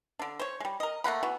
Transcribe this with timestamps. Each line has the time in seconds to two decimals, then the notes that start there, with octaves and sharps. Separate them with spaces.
0.19 D3 D4
0.39 C5 C#5
0.60 G3 G#3
0.80 A#4 D#5
1.04 A3 A#3 F#5 B5
1.23 E3 B3 F#4